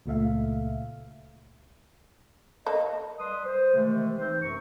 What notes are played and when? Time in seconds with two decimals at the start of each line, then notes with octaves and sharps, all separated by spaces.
0.06 C#2 A#2 A3 E5 F5
2.67 A#3 A4 D#5
3.19 G3 B4 C6 D#6
3.45 C5
3.74 C3 D#3 E3 G#3 A3
4.17 E3 C4 D#4 C5
4.42 F#2 C3 A#5 C#6